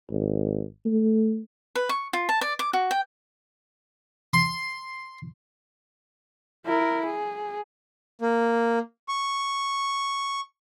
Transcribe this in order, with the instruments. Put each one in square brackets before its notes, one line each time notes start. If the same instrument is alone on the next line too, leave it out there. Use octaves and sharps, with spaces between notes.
[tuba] G#1
A3
[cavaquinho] B4
C#6
F4
A5
D5
D6
F#4
G5
[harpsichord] C6
[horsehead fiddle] E4 A#4
G#4
[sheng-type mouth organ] A#3
C#6